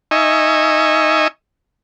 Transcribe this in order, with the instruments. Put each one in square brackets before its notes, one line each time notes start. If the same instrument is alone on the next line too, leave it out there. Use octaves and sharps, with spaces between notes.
[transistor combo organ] D#4 D#5 E5 G#5 C#6